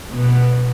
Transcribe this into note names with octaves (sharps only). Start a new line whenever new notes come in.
B2 B3